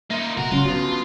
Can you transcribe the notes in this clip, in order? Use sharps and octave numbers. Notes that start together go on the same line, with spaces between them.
A#3 D#4 F4 E5
B2 F#4 A#4
C#3 F#3 C#4 F4 C6
D3 B3 D4 F#4